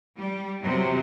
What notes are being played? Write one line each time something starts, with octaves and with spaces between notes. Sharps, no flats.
G3
E2 C3 F#3